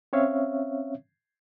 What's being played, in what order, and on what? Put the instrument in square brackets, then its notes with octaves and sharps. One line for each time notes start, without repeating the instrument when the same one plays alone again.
[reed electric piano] C4 C#4 C#5 E5 F5